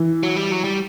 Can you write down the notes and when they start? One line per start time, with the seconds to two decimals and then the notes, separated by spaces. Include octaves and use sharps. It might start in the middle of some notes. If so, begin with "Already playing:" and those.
Already playing: E3
0.23 F#3
0.36 G3
0.51 F#3
0.64 G3